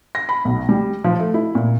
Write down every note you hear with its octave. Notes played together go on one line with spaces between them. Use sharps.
A#6
B5
B1
G3
F3
A3
E4
A#2